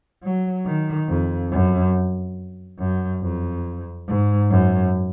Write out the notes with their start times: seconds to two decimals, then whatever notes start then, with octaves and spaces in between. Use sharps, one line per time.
0.23 F#3
0.66 D#3
1.09 F2
1.52 F#2
2.79 F#2
3.22 F2
4.08 G#2
4.50 F#2